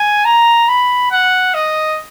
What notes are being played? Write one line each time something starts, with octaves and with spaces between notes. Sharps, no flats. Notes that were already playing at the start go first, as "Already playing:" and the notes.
Already playing: G#5
A#5
B5
F#5
D#5